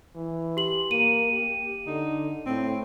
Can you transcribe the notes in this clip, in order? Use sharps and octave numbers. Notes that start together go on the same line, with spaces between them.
E3
G4 F#7
A#3 D#7
G4
D3 D#4
A2 C4